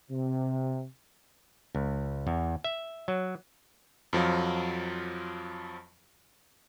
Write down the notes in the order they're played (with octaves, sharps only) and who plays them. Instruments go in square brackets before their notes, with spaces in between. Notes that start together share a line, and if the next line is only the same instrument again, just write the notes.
[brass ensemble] C3
[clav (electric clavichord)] C#2
E2
E5
F#3
[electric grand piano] F2 F3 F#3 F4